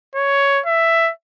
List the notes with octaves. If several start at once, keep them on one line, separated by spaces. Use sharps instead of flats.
C#5
E5